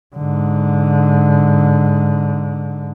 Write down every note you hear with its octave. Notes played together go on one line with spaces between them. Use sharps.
G#2 D3